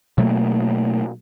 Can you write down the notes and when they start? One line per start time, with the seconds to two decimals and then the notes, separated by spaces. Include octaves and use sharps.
0.18 B2 F#3 A3 A#3